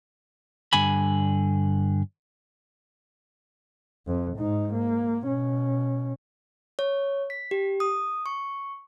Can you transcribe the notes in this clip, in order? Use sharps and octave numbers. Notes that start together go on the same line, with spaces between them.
G2 D3 G#5 B5
F2
G#2 D#4
A#3
B2 C#4
C#5
B6
G4
D#6
C#6